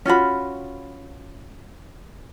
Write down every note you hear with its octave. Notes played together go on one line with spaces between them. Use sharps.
C#4 F4 F#4 B5